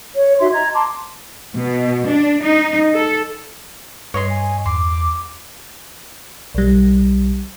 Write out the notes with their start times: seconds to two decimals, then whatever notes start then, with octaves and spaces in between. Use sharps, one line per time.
0.16 C#5
0.40 D#4 F#4 E5 C6
0.52 D#5 A#5 G#6
0.74 A5 A#5 C6 D6
1.54 B2
2.06 D4
2.42 D#4
2.94 A4
4.14 G2 B4 C#5 D#5 C6
4.30 G#5
4.66 E2 C6 D6
6.55 B1 G3